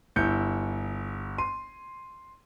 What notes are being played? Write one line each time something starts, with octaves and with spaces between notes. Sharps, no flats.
G1 E4 G6 C#7
C6 D#7